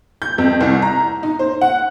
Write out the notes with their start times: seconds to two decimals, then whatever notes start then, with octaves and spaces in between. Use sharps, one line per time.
0.22 G6
0.38 F2
0.61 C2
0.82 A#5
1.23 D#4
1.39 C5
1.61 F#5